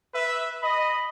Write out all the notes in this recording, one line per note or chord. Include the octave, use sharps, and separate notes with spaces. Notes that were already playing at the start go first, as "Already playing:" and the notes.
B4 E5
D#5 B5